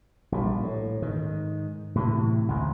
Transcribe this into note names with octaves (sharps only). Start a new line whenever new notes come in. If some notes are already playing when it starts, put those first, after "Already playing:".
A#1 G3
A2
G#2 D#3
A2 C3 E3
A1 D2 A#2 G#3